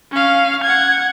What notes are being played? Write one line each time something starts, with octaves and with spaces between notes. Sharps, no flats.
C#4 F5
F#5 G#6